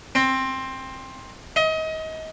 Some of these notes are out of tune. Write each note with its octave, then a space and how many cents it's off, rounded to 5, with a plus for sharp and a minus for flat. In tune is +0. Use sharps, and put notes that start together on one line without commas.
C4 +15
D#5 +30